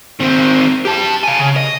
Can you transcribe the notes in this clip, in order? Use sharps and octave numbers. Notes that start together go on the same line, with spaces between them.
D#3 C4
G4 A5
F5 G#5
C#3
D#5